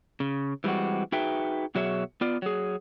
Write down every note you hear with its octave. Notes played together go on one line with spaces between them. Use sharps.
C#3
E3 G3 G#3 C4 F#4
D#4 F#4 G#4 B4 E5 G5
B2 F#3 F#4 G#4 C#5 E5
B3 F4 D5
F#3 G#4